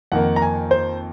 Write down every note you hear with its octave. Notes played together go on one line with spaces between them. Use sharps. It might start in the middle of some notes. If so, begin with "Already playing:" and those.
F2 D#3 A#3 F#5
A#5
G#5
C5